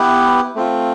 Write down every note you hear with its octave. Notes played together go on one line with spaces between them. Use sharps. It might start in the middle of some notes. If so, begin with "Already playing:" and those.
Already playing: B3 E4 G4 B4
A3 C4 F4